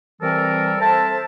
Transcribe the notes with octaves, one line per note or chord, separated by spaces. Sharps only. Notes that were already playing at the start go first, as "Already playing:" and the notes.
C3 E3 G3 C4 A4 A#4
C4 A4 C5 E5 A5